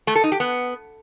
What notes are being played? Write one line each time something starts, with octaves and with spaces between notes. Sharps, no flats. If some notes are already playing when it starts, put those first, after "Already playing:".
A3
A4
D#4
G4
B3